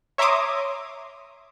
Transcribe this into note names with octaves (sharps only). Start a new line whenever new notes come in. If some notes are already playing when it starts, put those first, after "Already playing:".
C#5 E5 A#5 C6 D6 D#6